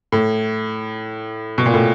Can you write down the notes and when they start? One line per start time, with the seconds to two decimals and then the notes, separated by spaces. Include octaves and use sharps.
0.12 A2
1.58 B2
1.66 A#2
1.74 A2